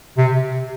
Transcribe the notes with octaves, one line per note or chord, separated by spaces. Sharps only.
C3